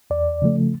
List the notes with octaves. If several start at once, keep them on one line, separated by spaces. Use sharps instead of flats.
E2 D5
C#3 F3 A3